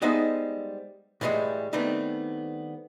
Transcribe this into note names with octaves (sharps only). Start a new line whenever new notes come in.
G3 G#3 B3 D#4 C5 E5
A2 E3 F3 G3 G#3
D#3 G3 A3 B3 C4 D4